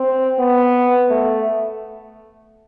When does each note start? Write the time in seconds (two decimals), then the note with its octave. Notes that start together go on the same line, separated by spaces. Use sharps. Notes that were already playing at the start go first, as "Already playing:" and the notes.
Already playing: C4
0.40 B3
1.10 A3